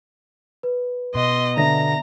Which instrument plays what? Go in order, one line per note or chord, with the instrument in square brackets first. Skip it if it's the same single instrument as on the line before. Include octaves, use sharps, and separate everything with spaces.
[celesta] B4
[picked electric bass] B2 [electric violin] D#5 C6
[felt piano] D3 B3 [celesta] D5 E5 A#6 [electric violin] A#5